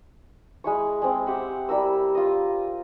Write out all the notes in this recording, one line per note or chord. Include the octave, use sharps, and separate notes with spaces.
G#3 E4 C#6
G#3 C4
G4 E5 F#5
G3 E4 A#4 E6
F4 D#5